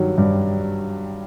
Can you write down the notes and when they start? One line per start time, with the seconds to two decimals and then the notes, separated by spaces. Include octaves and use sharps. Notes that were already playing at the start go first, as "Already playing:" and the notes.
Already playing: G2 D#3 F#3
0.18 G2